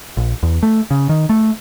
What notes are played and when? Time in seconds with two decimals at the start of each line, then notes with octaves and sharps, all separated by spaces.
0.17 A#1
0.43 E2
0.63 A3
0.91 C#3
1.09 D#3
1.29 A3